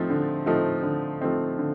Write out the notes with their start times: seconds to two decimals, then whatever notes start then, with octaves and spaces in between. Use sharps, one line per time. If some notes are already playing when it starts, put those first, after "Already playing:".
Already playing: F3 A3 C4 D#4
0.10 D3
0.46 F3 A3 C4 D#4
0.83 D3
1.21 F3 A3 C4 D#4
1.58 D3